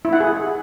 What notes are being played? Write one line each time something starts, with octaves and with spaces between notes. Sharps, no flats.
E4
F#5
G#4